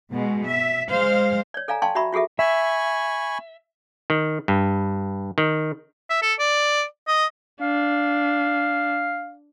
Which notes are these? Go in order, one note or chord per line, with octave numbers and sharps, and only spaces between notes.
B2 G#3
E5
G#3 C5 F5
C#5 D5
A4 D5 F5 G#5 A#5
D5 F5 G5 A5 C6 C#6
F#4 D5 E5 A#5 B5 C#6
F4 F#4 G#4 A4 E5
E5 G#5 B5 C#6
D#3
G2
D#3
E5
A4
D5
D#5
D4 F5